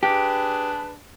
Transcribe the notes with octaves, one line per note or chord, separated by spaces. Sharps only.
D4 G4 G#4 B4